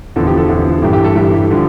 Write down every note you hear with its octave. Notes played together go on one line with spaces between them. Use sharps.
E2 D3 F3 A4
G4
A4
E2 D3 F3
G2 E3 G4
G4
A4
G2 E3 G4
D3 F3